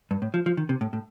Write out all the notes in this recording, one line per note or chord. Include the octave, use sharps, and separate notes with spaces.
G2
A2
F3
F3
D#3
C3
A2
A2